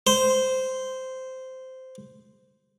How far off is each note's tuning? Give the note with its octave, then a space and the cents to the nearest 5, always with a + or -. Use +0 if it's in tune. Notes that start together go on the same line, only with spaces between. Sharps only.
C5 -10